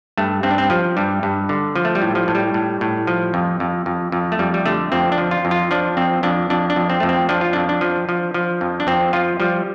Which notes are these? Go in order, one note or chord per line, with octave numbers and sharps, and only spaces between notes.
G2 A3
G2 C4
D4
C4
F3
G2 G3
G2
D3
F3
A3
G3
A2
F3
A2
G3
A2
A2
F3
F2
F2
F2
F2
A3
F2 G3
G3
D3 A3
F2 C4
D4
F3
F4
F2
F4
F3 D4
F2 C4
F2 D4
F2 D4
D4
F2
C4
F2 A3
C4
F3 D4
F4
F2 D4
D4
F3
F3
F3
F2
D4
F2 C4
F3 F4
F3 G3